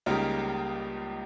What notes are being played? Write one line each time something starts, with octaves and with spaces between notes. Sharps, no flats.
C#2 C#3 G3 A#3 D#4